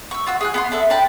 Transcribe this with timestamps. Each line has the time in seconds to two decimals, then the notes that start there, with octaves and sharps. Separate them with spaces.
0.11 C#6 E6
0.26 F4 F#4 E6
0.41 G#4 G#5 F#6
0.54 B3 G#5 C6
0.72 D4 A4 E5
0.90 D4 G5 A5 B5